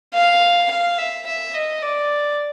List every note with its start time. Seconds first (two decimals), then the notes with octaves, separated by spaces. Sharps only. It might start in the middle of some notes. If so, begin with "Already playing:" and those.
0.14 F5
0.71 F5
0.98 E5
1.27 E5
1.54 D#5
1.83 D5